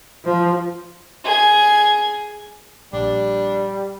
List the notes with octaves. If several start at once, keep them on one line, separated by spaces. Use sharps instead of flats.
F3
G#4 G#6
A#1 G3 D4